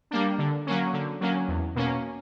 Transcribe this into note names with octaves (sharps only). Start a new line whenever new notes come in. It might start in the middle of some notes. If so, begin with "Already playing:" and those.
G3 A#3 D4
D3
F#3 A#3 C#4
D3
F#3 A#3 C#4
E2
B2 A#3 C#4